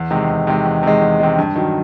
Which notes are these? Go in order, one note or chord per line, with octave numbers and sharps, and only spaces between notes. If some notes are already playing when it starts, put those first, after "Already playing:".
Already playing: E2
C3 D#3 G#3
E2
C3 D#3 G#3
E2
C3 D#3 G#3
E2
C3 D#3 G#3
G2
D#3 F#3